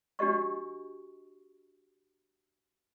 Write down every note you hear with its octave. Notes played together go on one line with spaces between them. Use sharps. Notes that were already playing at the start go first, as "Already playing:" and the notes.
D4 F#4 G4 D#5 C#6